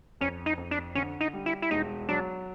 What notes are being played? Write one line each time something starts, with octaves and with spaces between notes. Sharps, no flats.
F2 C#4
D#4
F2
D4
D3 C#4
D#4
G3
E4
E4
E1 D#4
F#3 D4